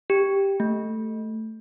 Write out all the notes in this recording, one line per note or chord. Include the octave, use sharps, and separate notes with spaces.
G4
A3